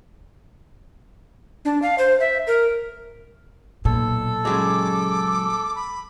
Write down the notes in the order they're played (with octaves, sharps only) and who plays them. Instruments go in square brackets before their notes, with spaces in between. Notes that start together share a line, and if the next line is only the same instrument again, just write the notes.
[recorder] D4
F5
C5
E5
A#4
[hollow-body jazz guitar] B1 [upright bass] A#2 [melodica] A4
[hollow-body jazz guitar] C#3 F#3 G#3 [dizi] D6
[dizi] B5